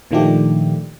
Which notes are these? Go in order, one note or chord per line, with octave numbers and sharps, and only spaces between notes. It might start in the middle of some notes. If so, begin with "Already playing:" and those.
A#2 D#3 F3 A3 D4 G4